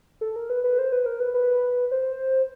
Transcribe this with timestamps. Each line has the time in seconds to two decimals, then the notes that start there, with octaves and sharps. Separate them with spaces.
0.21 A4
0.36 A#4
0.50 B4
0.64 B4
0.79 C5
0.92 B4
1.06 A#4
1.20 B4
1.34 B4
1.91 C5